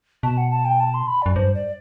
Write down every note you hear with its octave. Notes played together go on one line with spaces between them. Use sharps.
B2 A5
F#5
A5
G5
A5
C6
B5
F#2 D5
G2 C5
D5